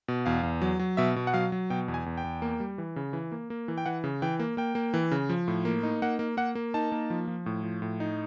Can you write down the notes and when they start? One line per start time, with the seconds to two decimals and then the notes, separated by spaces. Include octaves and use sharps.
0.08 B2
0.26 E2 F5
0.43 E2
0.62 F#3
0.79 F#3
0.97 B2 E5
1.16 B2
1.27 F#5
1.34 F#3 F5
1.52 F#3
1.70 B2 G5
1.88 E2
1.94 G#5
2.06 E2
2.18 G5
2.24 E2
2.42 A#3
2.60 G3
2.78 E3
2.96 C#3
3.13 E3
3.32 A#3
3.50 A#3
3.68 E3
3.78 G5
3.86 E3 F#5
4.04 C#3
4.22 E3 G5
4.39 A#3
4.57 A#3 G5
4.75 A#3
4.94 E3
5.11 C#3
5.29 F3
5.48 A2
5.65 A#3
5.83 D#4
6.02 A#3 F#5
6.19 A#3
6.37 A#3 F#5
6.55 A#3
6.74 D#4 A5
6.92 A#3
7.10 F3
7.27 F3
7.46 A2
7.63 F3
7.82 A2
8.00 D#4